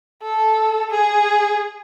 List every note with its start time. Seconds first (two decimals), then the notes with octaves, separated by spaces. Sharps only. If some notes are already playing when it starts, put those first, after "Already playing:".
0.23 A4
0.91 G#4